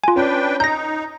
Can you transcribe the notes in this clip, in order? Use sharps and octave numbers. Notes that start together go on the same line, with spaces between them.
F4 G#5
C#4 D4 B4 G5
D#4 A#5 G6 A#6